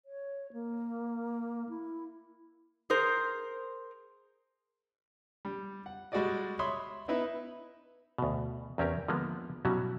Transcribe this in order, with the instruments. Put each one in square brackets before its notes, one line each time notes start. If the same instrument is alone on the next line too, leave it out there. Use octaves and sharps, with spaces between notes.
[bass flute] C#5
A#3
E4
[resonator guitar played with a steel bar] G#4 A#4 C5
[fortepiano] G3
F#5
G3 G#3 F#4 G#4 D5 D#5
C#5 E5 B5 C6 D#6
B3 D#4 E4 B4 E5
[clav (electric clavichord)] D2 B2
E2 C4 C#4 G4 A#4 A#5
D3 F3 G#3 A#3 B3
B2 F#3 G3 C#4 E4 F#4